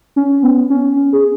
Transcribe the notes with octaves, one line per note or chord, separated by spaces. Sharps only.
C#4
B3
C#4
G#4